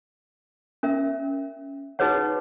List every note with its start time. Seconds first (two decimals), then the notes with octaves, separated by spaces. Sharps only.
0.83 C#4 A#4 E5
1.99 D#4 F#4 G#4 B4 C#5 F#5